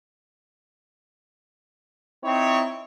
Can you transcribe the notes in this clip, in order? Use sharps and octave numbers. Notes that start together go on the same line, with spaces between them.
C4 D#4 E4 C#5